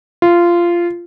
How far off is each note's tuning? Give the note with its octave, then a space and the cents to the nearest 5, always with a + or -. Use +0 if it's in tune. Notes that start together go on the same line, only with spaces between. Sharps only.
F4 -15